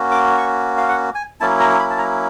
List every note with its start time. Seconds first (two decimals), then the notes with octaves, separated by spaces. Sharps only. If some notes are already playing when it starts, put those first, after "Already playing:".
Already playing: A#3 C#4 F#4
0.11 D6
0.38 C#6
0.77 F5
0.89 F#5
1.15 G#5
1.40 F#3 A#3 C#4 E4 A5
1.60 A#5
1.79 B5
1.90 A5
1.98 A#5